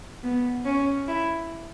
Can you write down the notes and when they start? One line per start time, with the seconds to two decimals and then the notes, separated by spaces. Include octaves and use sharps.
0.23 B3
0.65 C#4
1.07 E4